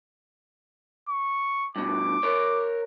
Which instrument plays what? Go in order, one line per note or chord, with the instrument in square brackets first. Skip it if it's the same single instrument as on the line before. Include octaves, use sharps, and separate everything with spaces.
[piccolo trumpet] C#6
[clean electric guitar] G2 B2 [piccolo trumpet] D6
[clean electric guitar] A#4 C#5